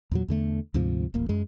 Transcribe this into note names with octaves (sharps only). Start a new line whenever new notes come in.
E2 A#2 F#3
E2 D3 A3
D2 G#2 C3 F3
D#1 A1 A#3
F#2 G#3